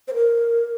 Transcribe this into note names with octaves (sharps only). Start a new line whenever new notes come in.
C5
A#4